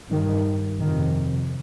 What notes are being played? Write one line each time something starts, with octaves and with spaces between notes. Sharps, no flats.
G2 D#3
F2 C3 D#3